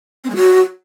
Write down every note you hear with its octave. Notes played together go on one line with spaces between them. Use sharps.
C4
G#3
F#4